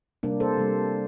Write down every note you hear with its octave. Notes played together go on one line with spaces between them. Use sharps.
C3 G3 A#3 D4
A4 C5
C3 G3 A#3